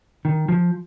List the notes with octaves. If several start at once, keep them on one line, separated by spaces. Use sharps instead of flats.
D#3
F3